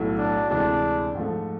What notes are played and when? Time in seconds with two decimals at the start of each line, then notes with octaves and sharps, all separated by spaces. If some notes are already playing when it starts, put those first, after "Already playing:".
Already playing: B1 A2 F#3 A3
0.18 D4
0.50 D2 C3 E3 G#3 D4
1.15 G#2 F3 A3